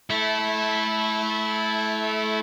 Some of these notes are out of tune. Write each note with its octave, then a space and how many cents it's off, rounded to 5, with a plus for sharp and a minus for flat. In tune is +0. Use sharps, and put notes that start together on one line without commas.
A3 -25 E4 -5